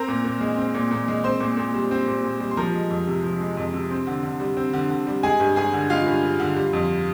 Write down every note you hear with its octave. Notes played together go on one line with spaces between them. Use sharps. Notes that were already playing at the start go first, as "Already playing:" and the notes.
Already playing: C4 A#4 A#5
A#2
A#2
G#3
C4
A#2
A#2
G#3
C4 C5 C6
A#2
A#2
G3
C4
A#2
A#2
G3
C6
F3 A#4 A#5
G#3
F2
C3
F3
G#3
F2
C3
C4
D3
D3
G3
C4
D3
D3
G3
G#3 G#4 G#5
G2
G2 G#4 G#5
D3
G#3 F4 F5
G2
G2
D3
G3
F2